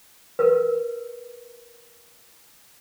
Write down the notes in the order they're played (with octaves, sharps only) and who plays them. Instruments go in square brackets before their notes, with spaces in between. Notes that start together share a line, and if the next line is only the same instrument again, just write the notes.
[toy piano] A#4 B4